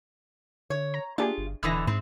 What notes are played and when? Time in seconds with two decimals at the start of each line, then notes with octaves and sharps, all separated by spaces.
0.70 D3 C#5
0.94 A#5
1.18 A#3 D4 F4 G4 G#4
1.38 G1
1.63 D#1 B2 D3 E3 E6 A#6
1.87 G#2 C4